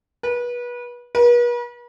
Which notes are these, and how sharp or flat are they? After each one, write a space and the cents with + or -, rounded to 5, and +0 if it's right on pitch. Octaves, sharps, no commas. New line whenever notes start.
B4 -30
B4 -45